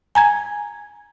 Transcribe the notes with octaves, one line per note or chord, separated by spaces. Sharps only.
G#5 A#5 G#6